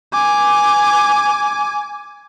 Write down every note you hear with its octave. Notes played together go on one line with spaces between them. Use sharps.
G#5 D6